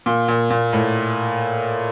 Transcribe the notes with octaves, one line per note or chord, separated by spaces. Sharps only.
A#2
A#2
A#2
A2